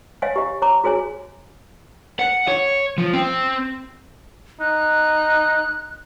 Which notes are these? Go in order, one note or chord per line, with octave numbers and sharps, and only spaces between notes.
C#5 D#5 F5 F#5 G#5
G4 D#5
C#5 A#5 D6
F#4 G#4 C#5 G#5
F#5
C#5
F3
C4
D#4 F#6